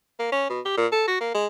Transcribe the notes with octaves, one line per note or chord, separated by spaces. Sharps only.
A#3
C#4
B2
G4
A#2
A4
F#4
A#3
G#3